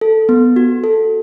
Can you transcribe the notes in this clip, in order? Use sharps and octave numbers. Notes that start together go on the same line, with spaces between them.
A4
B3
F#4
A4